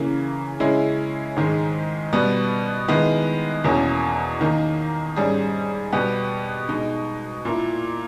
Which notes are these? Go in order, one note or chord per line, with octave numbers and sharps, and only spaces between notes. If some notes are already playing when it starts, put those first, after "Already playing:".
Already playing: C#3 E3 A#3
C#3 G#3 C#4 E4
G#2 D#3 G#3
B2 G3 B3
D#3 G#3 B3 E4
E2 B2 A#3 C#4
D#3 A#3 D#4
G#2 G3 C#4 G#4
B2 G3 B3 G4
B2 G#3 D#4
A#2 A#3 E4